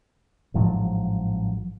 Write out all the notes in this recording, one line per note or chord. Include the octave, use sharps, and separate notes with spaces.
A1 G#2 F3 F#3